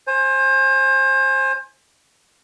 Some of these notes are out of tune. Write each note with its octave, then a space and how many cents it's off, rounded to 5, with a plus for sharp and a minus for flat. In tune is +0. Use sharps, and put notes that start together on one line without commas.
C5 +30 G#5 +0